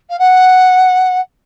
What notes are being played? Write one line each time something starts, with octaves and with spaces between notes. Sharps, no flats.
F5
F#5